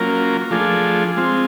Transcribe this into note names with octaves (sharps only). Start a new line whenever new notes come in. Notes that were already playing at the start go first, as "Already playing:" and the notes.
Already playing: F#3 A#3 C#4 F4 A#4
F3 A3 D4 F4 G#4
G#3 C4 F4